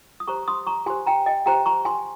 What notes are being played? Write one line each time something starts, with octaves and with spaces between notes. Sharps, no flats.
D#6
G4 C5 A#5 C#6
C6 D#6
A#5 C#6
G4 C5 G#5 C6
G5 A#5
D#5 G5
G4 C5 G5 A#5
A#5 C#6
G#5 C6